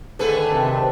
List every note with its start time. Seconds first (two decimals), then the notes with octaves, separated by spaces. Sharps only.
0.19 D3 D#3 A3 D4 G#4 A4 B4
0.52 C3